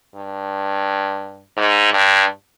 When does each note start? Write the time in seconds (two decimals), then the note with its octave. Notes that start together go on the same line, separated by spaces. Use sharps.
0.15 G2
1.57 G#2
1.93 G2